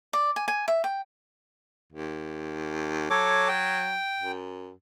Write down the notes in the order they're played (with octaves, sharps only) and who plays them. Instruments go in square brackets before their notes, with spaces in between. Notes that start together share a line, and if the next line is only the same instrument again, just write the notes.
[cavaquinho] D5
G#5
G#5
E5
G5
[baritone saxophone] D#2
[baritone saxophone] F#3 [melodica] A4 C#5 D6
[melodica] G5
[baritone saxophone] F#2